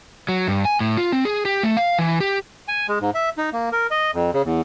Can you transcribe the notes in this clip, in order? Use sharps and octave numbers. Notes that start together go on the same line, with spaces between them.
F#3
G2
G#5
A2
F4
C4
G#4
G4
A3
F5
E3
G4
G#5
G#3
G#2
E5
D#4
A#3
A#4
D#5
F2
C#3
E2